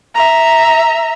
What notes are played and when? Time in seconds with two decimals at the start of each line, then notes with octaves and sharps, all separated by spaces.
0.15 E5 A#5